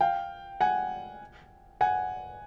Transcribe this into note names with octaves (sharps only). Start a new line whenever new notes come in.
F5 G5
F#5 G#5
F#5 G#5